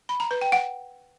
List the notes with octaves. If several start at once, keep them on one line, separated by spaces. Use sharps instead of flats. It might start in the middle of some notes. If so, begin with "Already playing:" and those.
B5
A#5
B4
G5
F#5